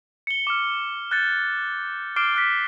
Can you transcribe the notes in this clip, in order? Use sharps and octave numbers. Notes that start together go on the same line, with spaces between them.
C#7 G7
D6 F6
F#6 G6 A6 C#7
D6 F6 G6 C7 D7 G7
F6 F#6 B6